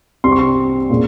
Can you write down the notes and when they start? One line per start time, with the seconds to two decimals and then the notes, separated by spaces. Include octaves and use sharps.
0.24 C2 C3 G3 C4 C6
0.32 C#6
0.39 C6
0.90 A#2 G#3 C#4